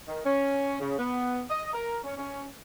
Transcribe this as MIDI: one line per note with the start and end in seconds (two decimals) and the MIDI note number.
0.08 0.20 51
0.25 0.77 61
0.80 0.96 49
0.99 1.42 59
1.50 1.70 75
1.74 1.98 70
2.04 2.15 61
2.17 2.45 61